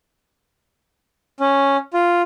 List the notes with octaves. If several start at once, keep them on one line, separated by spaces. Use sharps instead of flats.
C#4
F4